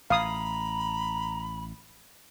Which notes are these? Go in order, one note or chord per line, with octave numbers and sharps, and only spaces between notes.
A1 F5 A#5 B5 D#6